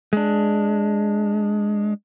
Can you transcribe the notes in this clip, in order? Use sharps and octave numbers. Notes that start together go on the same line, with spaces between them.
G#3 D4